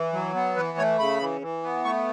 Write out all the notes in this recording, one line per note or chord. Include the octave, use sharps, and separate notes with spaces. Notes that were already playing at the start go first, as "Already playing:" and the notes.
Already playing: E3
F#3
B3
E3 B4
A3 C#5
C#3 B5
E3
E3
B3
A3 C#6